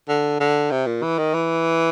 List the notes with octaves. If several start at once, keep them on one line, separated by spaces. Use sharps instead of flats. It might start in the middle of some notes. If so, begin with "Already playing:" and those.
D3
D3
C3
A#2
E3
D#3
E3